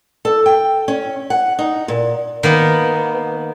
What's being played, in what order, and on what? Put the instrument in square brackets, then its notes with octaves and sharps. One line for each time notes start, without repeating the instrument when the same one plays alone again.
[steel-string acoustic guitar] A4
G5
C#4
F#5
D#4
A#2
[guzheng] D#3 A#3 B3